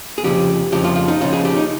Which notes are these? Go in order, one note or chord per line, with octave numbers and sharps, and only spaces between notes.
G#4
F2 C#3 F3 G4
F2 C#3 F3 G4
F4
F4
D#4
C#2 C#3 F3 F4
G#4
G4
D#4